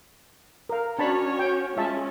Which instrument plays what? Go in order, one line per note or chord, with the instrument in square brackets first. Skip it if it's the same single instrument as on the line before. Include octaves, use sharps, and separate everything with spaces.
[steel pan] A#4 F5
[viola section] C#4 F#4 C#5 [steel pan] D4 A5 B5
[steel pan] G5
[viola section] G#3 C#4 [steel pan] F4 E5 A5